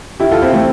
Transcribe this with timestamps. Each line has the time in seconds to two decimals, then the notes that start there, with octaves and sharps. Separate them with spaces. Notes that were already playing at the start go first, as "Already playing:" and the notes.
0.20 E4 G4
0.31 F4 A4
0.42 C4 E4
0.53 A3 C4